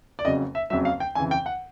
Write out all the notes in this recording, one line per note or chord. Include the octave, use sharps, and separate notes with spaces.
D5
F#1 F2 C#3 F#3 D#5
E5
F#1 F2 C#3 F#3 E5
F5
G5
F2 C#3 E3 G#5
G5
F#5